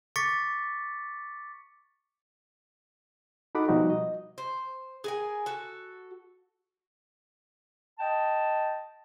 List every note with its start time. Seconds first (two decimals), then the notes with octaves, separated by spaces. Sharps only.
0.16 C#6 D6 A6 B6 C#7
3.55 D#4 F#4 A4 F#5 B5 D6
3.68 B2 F3 G3 D#4 F#4
3.90 D#5
4.38 C5
5.04 G#4 A#4 G#5
5.46 F#4 A4
7.99 D#5 G5 A5